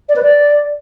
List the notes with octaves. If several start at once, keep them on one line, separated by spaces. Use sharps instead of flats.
D5
B4
D5